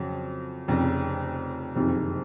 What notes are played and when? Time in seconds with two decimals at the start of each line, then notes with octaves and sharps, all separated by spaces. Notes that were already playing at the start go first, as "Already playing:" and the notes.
Already playing: F2 C#3 F#3
0.68 F1 F2 C#3
1.75 F#1 F2 C3 D#3